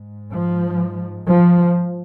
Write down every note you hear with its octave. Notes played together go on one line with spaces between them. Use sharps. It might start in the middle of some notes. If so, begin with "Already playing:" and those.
Already playing: G#2
F3
F3